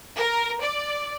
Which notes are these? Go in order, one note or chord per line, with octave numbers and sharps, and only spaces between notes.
A#4
D5